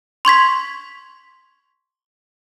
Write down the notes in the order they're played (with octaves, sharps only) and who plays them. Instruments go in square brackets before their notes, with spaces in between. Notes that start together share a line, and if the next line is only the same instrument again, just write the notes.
[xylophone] C6 C#6 G#6 B6